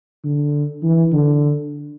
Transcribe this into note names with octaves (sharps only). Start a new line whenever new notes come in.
D3
E3
D3